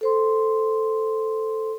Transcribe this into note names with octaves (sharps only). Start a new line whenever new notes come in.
A4 C5 C6